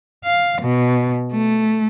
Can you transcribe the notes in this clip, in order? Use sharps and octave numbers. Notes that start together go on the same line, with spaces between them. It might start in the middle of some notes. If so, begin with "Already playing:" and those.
F5
B2
A3